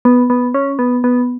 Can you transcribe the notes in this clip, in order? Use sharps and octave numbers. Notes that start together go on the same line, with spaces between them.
B3
B3
C#4
B3
B3